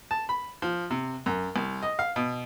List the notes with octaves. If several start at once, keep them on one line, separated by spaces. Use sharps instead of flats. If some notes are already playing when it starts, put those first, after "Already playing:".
A5
B5
F3
C3
F#2
C2
D#5
F5
B2